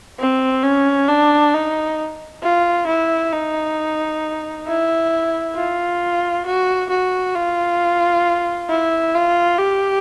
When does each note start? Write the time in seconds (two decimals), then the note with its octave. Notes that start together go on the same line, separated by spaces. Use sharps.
0.20 C4
0.64 C#4
1.09 D4
1.54 D#4
2.43 F4
2.87 E4
3.33 D#4
4.67 E4
5.56 F4
6.46 F#4
6.90 F#4
7.35 F4
8.70 E4
9.15 F4
9.59 G4